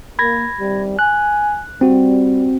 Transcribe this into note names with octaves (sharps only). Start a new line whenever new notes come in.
A#3 B5 G#6 A#6
C3 D#3 G3
G#5 F#6
G3 C4 F#4